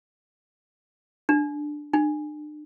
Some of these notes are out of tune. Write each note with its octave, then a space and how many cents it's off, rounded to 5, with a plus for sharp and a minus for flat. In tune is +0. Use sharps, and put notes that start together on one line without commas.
D4 +10
D4 +40